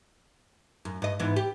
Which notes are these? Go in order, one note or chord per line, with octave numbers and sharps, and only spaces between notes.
F#2
G2 D#5
G#2 E3 B3
G4